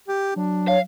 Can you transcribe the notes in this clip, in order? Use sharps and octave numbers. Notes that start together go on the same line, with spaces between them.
G4
F#3 D4
C#5 F5